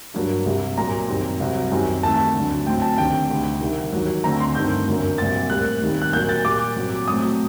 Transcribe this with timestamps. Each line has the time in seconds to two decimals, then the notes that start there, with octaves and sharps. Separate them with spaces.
0.14 G2 F#3 A#3
0.46 C2 C3 G3 C4
0.77 A#2 F#3 A#3 A#5
1.09 F#2 D#3 G3 C4
1.40 C2 C3 F#3 C4
1.71 F#2 D#3 G3 C4
2.03 D#2 D#3 A3 C4 A5
2.35 D2 D3 F#3
2.66 A2 F#3 C4 G5
2.82 A5
2.98 D#2 D3 A3 C4 G5
3.29 D2 C3 G3
3.61 C2 C3 D#3
3.93 D#2 D#3 F#3
4.24 D2 D3 A3 C4 A#5
4.40 C6
4.55 G2 D#3 A3 C4 G6
4.87 F#2 D3 F#3 A#3
5.18 C2 A#2 F#3 C4 A6
5.50 A2 G3 A#3 F#6
5.81 D#2 D#3 G3 C4
6.02 F#6
6.13 A#2 F#3 A#3 G6
6.29 A6
6.44 A#2 G3 A#3 D6
6.76 A#2 F#3 C4
7.07 A2 F#3 A3 C4 D#6